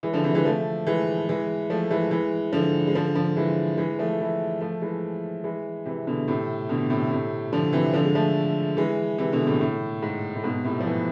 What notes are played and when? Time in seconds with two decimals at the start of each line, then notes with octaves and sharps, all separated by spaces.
0.03 E3 G#3
0.13 D3 F3
0.24 C3 E3
0.35 E3 G#3
0.45 F3 A3
0.87 E3 G#3
1.29 E3 G#3
1.70 F3 A3
1.90 E3 G#3
2.11 E3 G#3
2.53 D3 F3
2.87 G#3
2.94 D3 F3
3.15 D3 F3
3.37 E3 G#3
3.77 E3 G#3
3.99 F3 A3
4.20 E3 G#3
4.61 F3 A3
4.81 E3 G#3
5.44 E3 G#3
5.85 C3 E3
6.07 B2 D3
6.28 A2 C3
6.69 B2 D3
6.90 A2 C3
7.11 A2 C3
7.53 D3 F3
7.73 C3 E3
7.93 D3 F3
8.05 G#3
8.15 F3 A3
8.77 E3 G#3
9.18 C3 E3
9.32 B2 D3
9.47 A2 C3
9.61 A2
10.03 G#2
10.35 A2
10.44 G#2 B2
10.64 A2 C3
10.80 F3
10.85 C3 E3